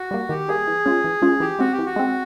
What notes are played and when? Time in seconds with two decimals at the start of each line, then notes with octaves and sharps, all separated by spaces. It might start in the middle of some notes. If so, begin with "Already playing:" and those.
Already playing: F#4
0.11 G3 A#3
0.29 D#3 G4
0.48 G3 A#3 G#4
0.67 E3
0.86 G#3 C#4 F4
1.04 E3
1.22 G#3 C#4 F4
1.40 E3 G4
1.59 G#3 C4 F#4
1.72 G4
1.79 E3
1.86 F#4
1.96 G#3 C4